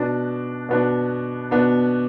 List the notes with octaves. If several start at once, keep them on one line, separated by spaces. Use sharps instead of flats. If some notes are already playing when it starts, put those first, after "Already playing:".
Already playing: B2 B3 D4
B2 B3 D4
B2 B3 D4